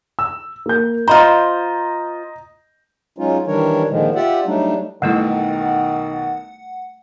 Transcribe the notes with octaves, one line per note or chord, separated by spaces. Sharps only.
E6
A#3 G6
F4 C5 D#5 A#5
F#3 G#3 C#4 D#4 F4
D#3 E3 G3 D4 A#4 C#5
A#2 D3 D#3 F3 G#3
F4 G4 D5 E5 F#5
F#3 G3 A3 D4 D#4
B1 B2 D#3 G3 A3 E4 A4 F#5